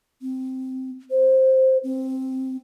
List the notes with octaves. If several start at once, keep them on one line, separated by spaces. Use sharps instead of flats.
C4
C5
C4